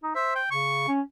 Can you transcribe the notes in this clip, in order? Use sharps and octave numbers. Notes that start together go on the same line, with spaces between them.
D#4
C5 E5
G5
C#3 C#6
C#4